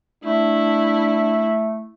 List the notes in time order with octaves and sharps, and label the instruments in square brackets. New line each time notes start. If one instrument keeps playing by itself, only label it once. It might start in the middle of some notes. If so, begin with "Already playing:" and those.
[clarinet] A3 [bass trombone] D4 [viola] E4